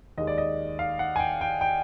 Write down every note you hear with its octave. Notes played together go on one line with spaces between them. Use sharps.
D#2 D#3 G#3 D#5
D5
D#5
F5
F#5
G#5
G5
G5
G5